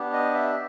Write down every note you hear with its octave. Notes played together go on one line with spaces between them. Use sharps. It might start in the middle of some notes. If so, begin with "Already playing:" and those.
Already playing: B3 D4 G4
D#5
E5